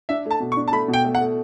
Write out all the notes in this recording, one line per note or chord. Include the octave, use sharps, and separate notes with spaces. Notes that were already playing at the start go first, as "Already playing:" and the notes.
D4 E5
A3
A5
B2
C#6
D4
A5
A3 B5
B2
G5
A3
F#5
A3